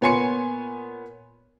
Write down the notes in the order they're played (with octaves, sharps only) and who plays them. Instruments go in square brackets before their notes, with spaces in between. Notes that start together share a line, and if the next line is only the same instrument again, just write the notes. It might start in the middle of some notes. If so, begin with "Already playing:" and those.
[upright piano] A#2 B3 C#5 G#5 C6 C#7